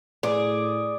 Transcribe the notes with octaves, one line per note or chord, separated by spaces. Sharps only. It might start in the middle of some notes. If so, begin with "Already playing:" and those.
A2 G#4 D5